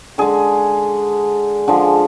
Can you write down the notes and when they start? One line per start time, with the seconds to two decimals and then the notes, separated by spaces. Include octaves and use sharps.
0.18 D3 G#3 G#4
1.68 D3 F3 G#3